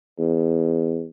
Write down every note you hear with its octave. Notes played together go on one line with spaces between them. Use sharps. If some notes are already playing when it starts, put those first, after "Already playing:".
E2